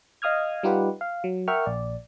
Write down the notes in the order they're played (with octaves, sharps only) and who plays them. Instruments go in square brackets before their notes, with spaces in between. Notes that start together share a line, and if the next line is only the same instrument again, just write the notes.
[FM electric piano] D#5 F5 D#6 F6 G#6
G3 D#4 F4 G4 B4 F#5
F5
F#3
A#4 E5 F#5 G5 C#6 F6
A#1 D5